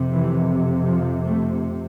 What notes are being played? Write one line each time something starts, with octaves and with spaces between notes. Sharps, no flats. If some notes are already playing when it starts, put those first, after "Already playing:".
Already playing: F2 C3
E3
F3
A3